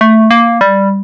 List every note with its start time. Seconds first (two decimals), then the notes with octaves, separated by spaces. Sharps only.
0.01 A3
0.31 A#3
0.61 G3